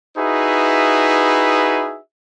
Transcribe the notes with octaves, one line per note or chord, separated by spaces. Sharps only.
D#4 E4 F#4 G#4 B4 E5